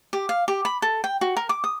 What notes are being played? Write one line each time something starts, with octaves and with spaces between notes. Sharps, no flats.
G4
F5
G4
B5
A4
G5
F#4
A#4
D6
D#6